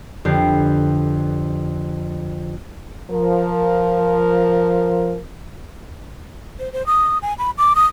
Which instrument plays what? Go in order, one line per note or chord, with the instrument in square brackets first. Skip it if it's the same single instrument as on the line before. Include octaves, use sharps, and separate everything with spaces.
[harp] F2 D3 G4 B4 C7
[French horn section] F3 A#4
[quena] C5
C5
D#6
G#5
B5
D6
D#6